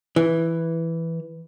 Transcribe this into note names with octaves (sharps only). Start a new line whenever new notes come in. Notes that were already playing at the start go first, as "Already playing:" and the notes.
E3